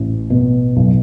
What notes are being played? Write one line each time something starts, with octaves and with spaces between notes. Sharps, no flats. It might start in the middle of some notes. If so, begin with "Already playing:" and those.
Already playing: A1
B2
B1